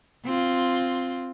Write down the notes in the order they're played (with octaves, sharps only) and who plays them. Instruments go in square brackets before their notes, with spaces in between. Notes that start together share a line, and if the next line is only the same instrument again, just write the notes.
[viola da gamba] C4 F4